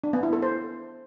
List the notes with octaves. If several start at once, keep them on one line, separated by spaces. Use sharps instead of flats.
D4
B3
E4
A4
C5